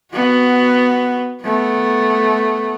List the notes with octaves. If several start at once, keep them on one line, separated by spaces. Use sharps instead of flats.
B3 F#4
A3 B3